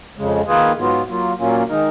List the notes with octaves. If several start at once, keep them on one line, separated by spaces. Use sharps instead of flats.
F2 C#3 G#3
D#3 A#3 F4 G#4 B4
G#2 F#3 B3 F4
F#3 A#3 F4
A#2 F#3 A#3 C#4 F4
D#3 G#3 D#4 A#4